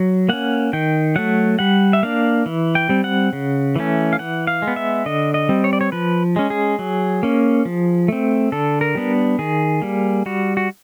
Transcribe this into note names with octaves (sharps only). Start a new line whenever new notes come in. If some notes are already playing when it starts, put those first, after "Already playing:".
Already playing: F#3
A#3 C#4 F#5
D#3 G5
F#3 A3 F#5
G3 F#5
E5
A#3 D4 F5
E3
G5
G3 C4
F#5
C#3
E3 A3 C#4
F5
E3 F#5
F5
G#3
B3
E5
D3 D#5
D#5
G3 C4
C#5
D5
C#5
F3 B4
G#3 C#4
G#4
F#3
A#3 C#4
F3
A3 C4
D3 A4
A#4
G3 B3 D4
D#3 G#4
G3 A#3
G3 F#4
F#4